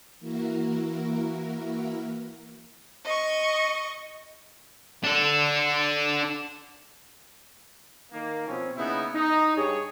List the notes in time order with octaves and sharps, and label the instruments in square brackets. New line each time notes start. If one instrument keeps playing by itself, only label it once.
[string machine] E3 A#3 E4 F#4 A#4
[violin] D#5 C#6
[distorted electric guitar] D4 A4
[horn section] D#3 A#3
B2 F3 C4 C#4
C#3 A#3 B3 D#4 E4
D#4
G2 G3 G#4 C#5